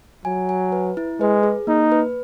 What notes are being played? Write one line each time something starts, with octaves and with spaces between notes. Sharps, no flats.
F#3 G#5
G#5
B4
E4
G#3 B4
G#4
A#3 D#4
B4